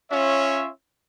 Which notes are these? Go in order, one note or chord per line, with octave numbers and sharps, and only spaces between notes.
C#4 F4 C#5 E5